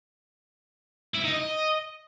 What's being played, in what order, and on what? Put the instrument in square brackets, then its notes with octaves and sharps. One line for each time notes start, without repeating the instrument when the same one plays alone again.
[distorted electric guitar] E4
D#4
D#5